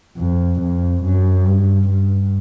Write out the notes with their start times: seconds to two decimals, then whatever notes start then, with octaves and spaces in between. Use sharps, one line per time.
0.17 F2
0.61 F2
1.04 F#2
1.45 G2
1.88 G2